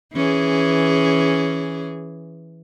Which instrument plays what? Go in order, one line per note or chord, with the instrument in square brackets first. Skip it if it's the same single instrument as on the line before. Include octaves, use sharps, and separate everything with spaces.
[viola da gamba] E3 C#4 G#4